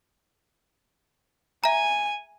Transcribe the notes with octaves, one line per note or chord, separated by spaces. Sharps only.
E5 G#5 A#5